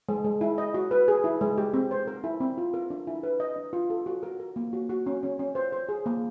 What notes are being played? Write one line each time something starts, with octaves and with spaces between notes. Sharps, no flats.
G#3
G#3
E4
D#5
F#4
B4
G#4
E4
G#3
G4
C4
C5
A#4
E4
C4
F4
A#4
D4
E4
B4
D#5
D4
F4
A4
F#4
A#4
A#4
A#3
F#4
F#4
C#4
C#4
C#4
C5
C5
G#4
A#3